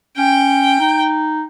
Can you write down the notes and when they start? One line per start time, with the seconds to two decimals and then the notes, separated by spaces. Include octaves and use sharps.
0.18 C#4 G5
0.80 D#4